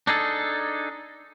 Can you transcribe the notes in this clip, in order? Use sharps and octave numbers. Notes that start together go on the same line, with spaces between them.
D4 D#4 G#4 A4